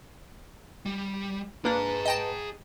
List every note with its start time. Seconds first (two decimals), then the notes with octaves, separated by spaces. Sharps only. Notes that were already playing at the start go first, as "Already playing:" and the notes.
0.86 G3
1.65 A#3 D4 G#4 B4 A#5
2.05 D#5 G5 A5